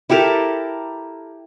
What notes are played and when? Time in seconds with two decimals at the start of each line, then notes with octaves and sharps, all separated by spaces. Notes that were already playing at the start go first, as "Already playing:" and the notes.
0.10 E4 G4 A4 A#4